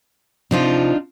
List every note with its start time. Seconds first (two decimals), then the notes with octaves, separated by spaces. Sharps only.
0.51 C3 F3 D4 D#4 F4